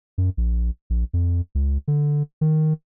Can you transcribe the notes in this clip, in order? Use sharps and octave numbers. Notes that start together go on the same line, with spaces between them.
F#2
A#1
A#1
F2
C#2
D3
D#3